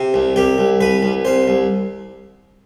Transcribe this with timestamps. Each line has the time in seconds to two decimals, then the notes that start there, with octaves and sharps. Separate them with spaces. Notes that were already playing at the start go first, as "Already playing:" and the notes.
Already playing: C3
0.14 C2
0.36 C2 G4
0.58 C2
0.81 C2 B4
1.03 C2
1.25 C2 C5
1.48 C2